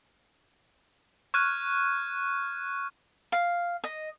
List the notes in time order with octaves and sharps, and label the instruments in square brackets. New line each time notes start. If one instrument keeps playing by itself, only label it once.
[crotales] C#6 F6 F#6 G#6 D#7
[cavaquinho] F5
D#5